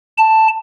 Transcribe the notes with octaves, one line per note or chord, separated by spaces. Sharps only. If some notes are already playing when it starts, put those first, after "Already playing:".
A5